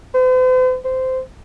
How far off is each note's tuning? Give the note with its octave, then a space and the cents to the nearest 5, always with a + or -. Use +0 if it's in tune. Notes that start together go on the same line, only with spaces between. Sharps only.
C5 -45
C5 -15